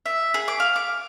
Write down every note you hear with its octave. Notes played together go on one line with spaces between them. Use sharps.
E5
G#4
D6
F5
D6